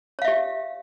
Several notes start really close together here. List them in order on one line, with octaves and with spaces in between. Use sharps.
C#5 F5 E5 G4